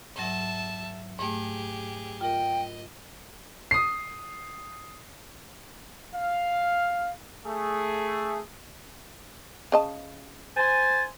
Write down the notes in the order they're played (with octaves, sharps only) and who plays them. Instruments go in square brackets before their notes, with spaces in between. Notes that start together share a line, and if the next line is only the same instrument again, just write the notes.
[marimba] G#2 F#3 [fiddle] E5 A5
[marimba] G#2 A3 [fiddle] G4 G#4
[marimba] F4 A#4 [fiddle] D#5 [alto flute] G5
[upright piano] D#6 C7
[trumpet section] F5
A3 G#4
[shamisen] C#3 D#5 A5
[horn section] C5 G#5 [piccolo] A6